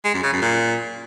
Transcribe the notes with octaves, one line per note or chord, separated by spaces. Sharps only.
G#3
F#2
C#3
F#2
A#2